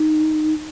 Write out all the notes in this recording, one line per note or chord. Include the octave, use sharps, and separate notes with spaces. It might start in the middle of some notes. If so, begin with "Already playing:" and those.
Already playing: D#4